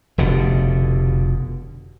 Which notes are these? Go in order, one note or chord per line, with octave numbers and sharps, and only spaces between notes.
F1 B2 D3